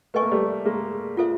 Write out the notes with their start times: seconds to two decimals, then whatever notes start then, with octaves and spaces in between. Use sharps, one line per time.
0.14 A3 B4 D#5 G#5 C#6
0.22 A#3
0.32 G3 A3
0.65 G#3 A#3
1.17 F4 A4 C5 E5